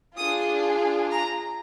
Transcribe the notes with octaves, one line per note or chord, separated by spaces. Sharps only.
D4 F4 G#4 D#6
A#5